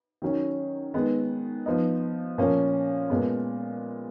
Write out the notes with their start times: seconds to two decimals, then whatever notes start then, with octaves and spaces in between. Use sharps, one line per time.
0.22 D#3 F#3 C#4
0.94 D#3 G#3 B3
1.66 F3 B3 D#4
2.38 A#2 F3 A#3 C#4
3.10 A#2 G#3 B3